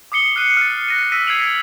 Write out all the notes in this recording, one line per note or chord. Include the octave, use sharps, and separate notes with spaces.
D6 D#6 C7 C#7 G7
F6 F#6 C7 D#7 G7
F6 A6
F#6 A#6 D#7
E6 A#6 B6 D7 D#7
F6 G#6 C7 D7 F7 F#7